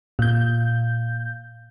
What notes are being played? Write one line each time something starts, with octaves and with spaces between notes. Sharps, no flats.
A#2 G6